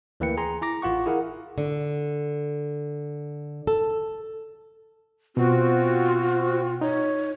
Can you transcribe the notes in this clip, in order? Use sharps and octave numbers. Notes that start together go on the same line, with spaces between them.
D2 E3 A#3 B4 G5 C#7
G#4 G#5 A#5 C6
E4 A#5 D6 A#6
A1 F4 F#5 C#6
E4 G#4 A#4 F5 F#5
D3
A4
B2 C4 F4 F#4
D#4 C#5